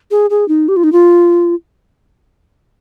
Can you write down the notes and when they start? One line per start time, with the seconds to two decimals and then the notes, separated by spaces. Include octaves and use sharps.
0.11 G#4
0.30 G#4
0.48 D#4
0.68 G4
0.76 F4
0.84 D#4
0.93 F4